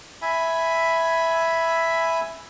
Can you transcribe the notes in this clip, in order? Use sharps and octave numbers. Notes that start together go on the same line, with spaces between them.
E5 G#5 B5